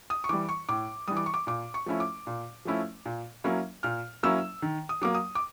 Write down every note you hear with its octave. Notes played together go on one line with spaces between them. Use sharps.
D#6
C#6
E3 G3 D6
C#6
A2 D6
E3 G3 D#6
D6
C#6
D6
A#2 D6
C#6
F3 A3 C#4 E4
D6
A#2
F3 A3 C#4 E4
A#2
F#3 A#3 C#4 E4
A#2 F6
F#3 A#3 C#4 E4 E6
D#3
D#6
F#3 A#3 D6
D#6
D6